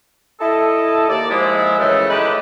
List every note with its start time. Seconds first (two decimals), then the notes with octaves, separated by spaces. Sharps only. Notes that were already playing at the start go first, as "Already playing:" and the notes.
0.40 E4 A4 D#5
1.08 D#2 D5
1.30 F3 G#3 E4
1.79 F#2 C#3 E3 G#3 A3
2.10 G#3 A3 D#4 E4 G4 B4